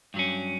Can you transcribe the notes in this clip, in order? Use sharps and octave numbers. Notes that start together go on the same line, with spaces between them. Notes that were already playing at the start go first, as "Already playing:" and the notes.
G2 F#3 C#4